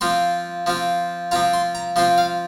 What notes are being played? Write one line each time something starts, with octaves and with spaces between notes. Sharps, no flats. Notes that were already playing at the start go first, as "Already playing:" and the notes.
F3 C4 F4 C6
F3 C4 F4
F3 C4 F4 A#5
C6
A#5
F3 C4 F4 C6
F5